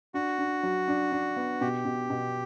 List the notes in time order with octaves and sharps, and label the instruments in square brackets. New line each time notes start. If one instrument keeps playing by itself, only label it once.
[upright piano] D4 [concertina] F#4
[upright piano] D4
F#3
D4
D4
B3
[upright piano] B2 [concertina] G4
[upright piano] B2
B2